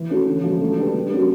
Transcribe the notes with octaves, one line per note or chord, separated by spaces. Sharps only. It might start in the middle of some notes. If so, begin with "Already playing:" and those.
Already playing: E3
A3 C#4 F#4 A4
D3
F3 G#3 C#4 F#4
A3
D4 G4 B4
G3
A#3 C#4 F#4